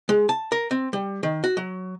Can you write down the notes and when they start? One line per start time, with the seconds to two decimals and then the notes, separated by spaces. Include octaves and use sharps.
0.09 G#3
0.29 A5
0.52 A#4
0.71 C4
0.93 G3
1.23 D#3
1.44 F#4
1.57 F#3